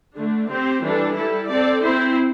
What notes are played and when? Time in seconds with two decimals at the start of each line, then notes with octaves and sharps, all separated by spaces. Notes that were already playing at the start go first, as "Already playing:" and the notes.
0.17 D3 A3 D4
0.49 C4 G4 C5
0.83 E3 G3 D4 A4
1.16 G3 E4 A4
1.49 C4 A4 D5
1.82 C4 E4 C5